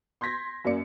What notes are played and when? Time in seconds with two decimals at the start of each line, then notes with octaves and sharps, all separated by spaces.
0.21 C6 G6 G#6 A#6 B6
0.64 F#2 A#3 D5 C#7